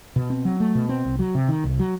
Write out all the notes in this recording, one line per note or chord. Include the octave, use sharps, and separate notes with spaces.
B2
C4
F#3
A3
B2
C4
C2
F#3
C3
D#3
C2
F#3